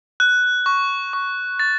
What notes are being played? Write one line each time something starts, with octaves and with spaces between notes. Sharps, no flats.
F#6
C#6
C#6
C#6 A6